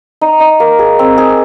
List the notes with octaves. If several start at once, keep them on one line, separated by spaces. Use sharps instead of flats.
D#4
D#4
A#3
G#4
C4
G#4